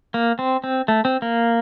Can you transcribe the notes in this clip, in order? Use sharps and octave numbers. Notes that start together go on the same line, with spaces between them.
A#3
C4
C4
A3
C4
A#3